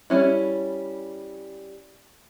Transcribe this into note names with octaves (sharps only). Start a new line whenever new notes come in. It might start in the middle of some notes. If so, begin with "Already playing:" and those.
G3 C#4 E4